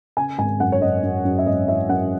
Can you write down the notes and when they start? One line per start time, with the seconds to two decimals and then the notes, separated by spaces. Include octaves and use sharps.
0.17 C#3 G#5
0.38 G#1 G#5
0.60 F#2 F#5
0.72 C#5
0.81 F#2 D#5
1.03 F#2
1.25 F#2
1.38 E5
1.46 G#1 D#5
1.68 E3 E5
1.89 F#2 F#5